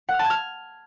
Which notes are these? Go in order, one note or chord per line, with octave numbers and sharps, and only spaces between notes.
F#5
F6
A5
G#6
F6